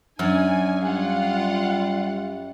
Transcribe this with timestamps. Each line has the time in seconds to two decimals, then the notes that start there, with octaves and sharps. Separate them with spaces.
0.19 F#2 D4 G#5
0.82 G3 F4 F5 F#5